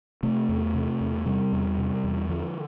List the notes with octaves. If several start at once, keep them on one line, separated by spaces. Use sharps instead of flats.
C3 A3
E2
C3
E2
C3 G3
E2
C3
E2
D3 F3